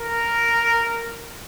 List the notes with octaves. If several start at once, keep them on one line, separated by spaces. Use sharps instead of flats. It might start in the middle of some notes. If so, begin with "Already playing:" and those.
Already playing: A#4